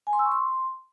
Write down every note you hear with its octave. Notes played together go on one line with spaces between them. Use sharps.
G#5
C6
E6
C#6
C6